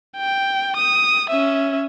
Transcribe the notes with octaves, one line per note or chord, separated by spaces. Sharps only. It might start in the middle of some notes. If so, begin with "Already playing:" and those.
G5
D#6
C#4 E5